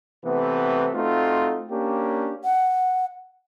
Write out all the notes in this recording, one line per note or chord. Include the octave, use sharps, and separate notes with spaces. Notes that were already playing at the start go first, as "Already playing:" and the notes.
C3 E3 A3 B3
A3 C4 D#4 F4 F#4
A#3 C#4 D4 G4
F#5